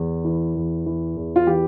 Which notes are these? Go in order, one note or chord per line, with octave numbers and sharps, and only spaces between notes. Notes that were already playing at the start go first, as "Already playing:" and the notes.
Already playing: E2
E3
E2
E3
E2
F4
E3 G4